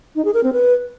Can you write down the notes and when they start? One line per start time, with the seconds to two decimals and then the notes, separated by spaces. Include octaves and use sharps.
0.16 D#4
0.25 G#4
0.34 A#4
0.43 C4
0.53 B4